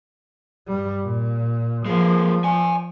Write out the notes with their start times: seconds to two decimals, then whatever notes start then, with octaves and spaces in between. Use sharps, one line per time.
0.67 G2 G3
1.00 A#2
1.86 F3 G#3 A#3
2.44 D5 G#5